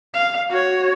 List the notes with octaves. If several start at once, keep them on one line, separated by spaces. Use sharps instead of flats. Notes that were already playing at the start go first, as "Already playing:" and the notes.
F5
F#4 C#5